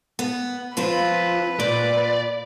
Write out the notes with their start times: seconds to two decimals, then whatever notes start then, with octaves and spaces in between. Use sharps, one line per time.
0.19 B3
0.77 F3 C4 F4 B4
1.60 A#2 D5